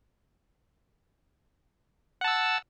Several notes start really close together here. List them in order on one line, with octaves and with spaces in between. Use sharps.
F#5 A5 E6